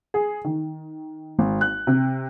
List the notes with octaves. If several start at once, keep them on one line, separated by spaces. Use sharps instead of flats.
G#4
D#3
G#1
F#6
C3